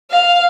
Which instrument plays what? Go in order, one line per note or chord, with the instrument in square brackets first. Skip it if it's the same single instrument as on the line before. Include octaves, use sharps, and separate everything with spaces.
[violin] F5